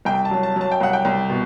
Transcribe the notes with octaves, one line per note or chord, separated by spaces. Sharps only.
C2 G5
A5
F#3
A5
F#3
A5
G5
C2 F#5
G5
C2
B2